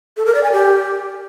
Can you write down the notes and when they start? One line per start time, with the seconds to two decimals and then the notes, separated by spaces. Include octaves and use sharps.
0.17 A4
0.26 A#4
0.35 D5
0.43 G#5
0.52 G4